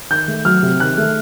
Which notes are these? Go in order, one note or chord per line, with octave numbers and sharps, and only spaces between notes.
D#3 G6
A3
F#3 F6
C3
D#3 F#6
A3